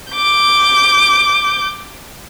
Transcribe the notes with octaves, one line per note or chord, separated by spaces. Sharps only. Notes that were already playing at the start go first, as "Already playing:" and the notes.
D6 G6